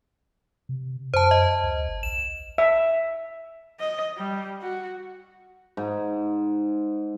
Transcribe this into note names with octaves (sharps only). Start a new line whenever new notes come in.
C3
F#2 C5 A5
D#5
D2
G1
A#1 E7
E5
D#5
G3
F#4
G#2